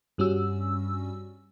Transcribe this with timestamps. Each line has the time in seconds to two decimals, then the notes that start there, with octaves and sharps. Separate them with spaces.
0.18 G2 G3 C#4 F#4 E6